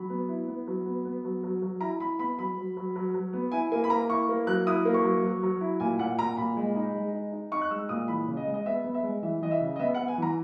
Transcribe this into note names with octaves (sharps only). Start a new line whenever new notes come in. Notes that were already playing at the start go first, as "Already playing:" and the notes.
Already playing: F#3 B5
B3
E4
B3
F#3
B3
B3
F#3
F#3
F#3
E4 A#5
E4 B5
B3 B5
F#3 B5
F#3
F#3
F#3
F#3
B3
E4 G#5
A#3 G#5
B5
A#3 A#5
E4 C#6
A#3
F#3 F#6
E4 D#6
A#3
C#6
F#3
F#3
F#3
E4
A#2 G#5
A#2 F#5
A#2 A#5
A#2 B5
G#3
D#4
G#3
D#4
D#4
D#4 C#6
F#6
G#3 E6
A#2 D#6
E3 B5
C#3
D#5
G#3
D#5
B3 E5
B3
E5
G#3
E3 E5
E3 D#5
E5
C#3
D#5
B3 E5
B3 F#5
G#5
E3 A#5